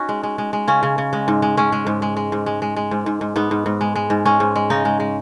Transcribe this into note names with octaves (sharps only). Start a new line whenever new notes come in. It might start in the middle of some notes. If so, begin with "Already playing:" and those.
Already playing: C#4 D#4 F#4
G#3
G#3
G#3
G#3
C#3 C#4
C#3
C#3
G#3
G#2
G#3
G#3 C#4
G#3
G#2
G#3
G#3
G#2
G#3
G#3
G#3
G#2
G#2
G#2
G#2 B3
G#2
G#2
G#3
G#3
G#2
G#3 C#4
G#2
G#3
C#3 D#4
G#3
G#3